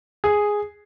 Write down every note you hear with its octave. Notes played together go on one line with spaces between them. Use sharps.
G#4